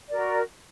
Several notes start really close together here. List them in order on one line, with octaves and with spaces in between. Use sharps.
D5 A#4 F#4